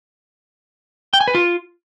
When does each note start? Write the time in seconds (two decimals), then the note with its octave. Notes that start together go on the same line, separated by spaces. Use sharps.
1.14 G5
1.21 G#5
1.28 B4
1.35 F4